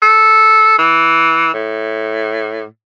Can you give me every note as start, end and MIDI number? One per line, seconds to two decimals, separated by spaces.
0.02 0.76 69
0.79 1.53 52
1.54 2.64 45